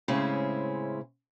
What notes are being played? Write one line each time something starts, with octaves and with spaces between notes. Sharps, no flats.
A2 C#3 G#3 C4 C#4 E4